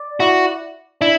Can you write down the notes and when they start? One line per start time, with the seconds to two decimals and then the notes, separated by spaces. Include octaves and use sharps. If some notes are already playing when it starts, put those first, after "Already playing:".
Already playing: D5
0.20 E4 F#4
1.01 D4 E4